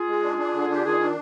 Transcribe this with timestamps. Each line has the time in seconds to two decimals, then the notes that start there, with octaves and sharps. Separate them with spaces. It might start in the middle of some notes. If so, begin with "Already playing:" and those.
Already playing: F4 G#4
0.08 G#3
0.23 D4
0.38 D4
0.54 D3
0.70 D4
0.75 G4
0.84 D#3 F4 G#4
1.00 D4